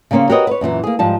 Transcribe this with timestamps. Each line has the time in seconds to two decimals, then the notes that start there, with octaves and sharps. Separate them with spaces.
0.11 C#3 G3 A#3 C#4 C5
0.30 F#4 G4 A#4 B4 C#5 D#5
0.47 B4 C#5
0.61 F#2 A#2 D#3 E3
0.83 A#3 G#4
0.99 G#2 F3 G3 A5